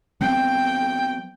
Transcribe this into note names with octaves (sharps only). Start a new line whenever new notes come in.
F#3 B3 C4 G5